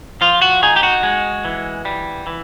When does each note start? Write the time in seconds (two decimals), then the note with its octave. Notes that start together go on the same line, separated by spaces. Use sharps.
0.21 F3 F4
0.42 F#4
0.63 D#4 G#4
0.76 G4
0.83 F#4
1.03 G#3
1.45 E3
1.85 G3
2.27 E3